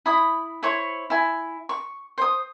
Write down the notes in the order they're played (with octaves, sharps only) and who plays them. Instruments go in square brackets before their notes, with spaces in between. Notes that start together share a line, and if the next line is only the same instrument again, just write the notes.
[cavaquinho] E4 B5 D#6
E4 C5 C#5 C#6
E4 G#5
C#6
C5 D#6